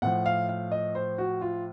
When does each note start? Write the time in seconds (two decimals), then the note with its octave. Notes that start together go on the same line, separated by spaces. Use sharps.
0.02 A2 F3 F#5
0.26 F5
0.49 F5
0.71 D#5
0.95 C5
1.18 F#4
1.41 F4